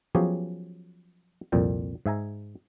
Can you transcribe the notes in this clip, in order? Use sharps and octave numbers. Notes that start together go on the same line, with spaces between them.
F3 F#3 B3 C#4 G4 G#4
C2 F2 A#2 G5
G#2 E5 G#5 A#5